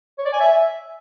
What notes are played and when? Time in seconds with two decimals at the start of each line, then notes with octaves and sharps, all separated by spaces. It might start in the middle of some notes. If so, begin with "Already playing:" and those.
0.18 C#5
0.25 D5
0.33 G#5
0.40 E5